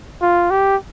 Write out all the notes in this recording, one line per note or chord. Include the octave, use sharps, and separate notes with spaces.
F4
G4